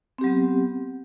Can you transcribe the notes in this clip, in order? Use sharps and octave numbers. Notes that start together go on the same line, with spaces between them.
F#3 B3 C4 G4